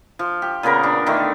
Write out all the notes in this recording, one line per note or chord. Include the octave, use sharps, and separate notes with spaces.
F3
G4
A#2 C#3 B3 A#4
D4
D3 D#3 A3